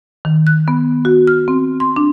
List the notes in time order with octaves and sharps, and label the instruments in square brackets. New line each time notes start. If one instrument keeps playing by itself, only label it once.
[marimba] D#3
F#6
B3
F#4
F6
C4
C6
D4